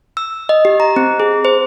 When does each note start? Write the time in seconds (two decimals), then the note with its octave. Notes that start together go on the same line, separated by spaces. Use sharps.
0.17 E6
0.49 D#5
0.65 G4
0.80 A#5
0.96 C4
1.20 G#4
1.45 C5